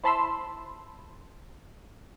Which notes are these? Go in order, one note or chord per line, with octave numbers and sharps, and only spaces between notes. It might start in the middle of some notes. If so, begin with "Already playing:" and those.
E4 C5 A5 B5 C6 E6